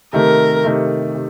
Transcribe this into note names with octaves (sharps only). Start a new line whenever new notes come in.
C3 D#3 A3 A#4
C3 D#3 A3
C3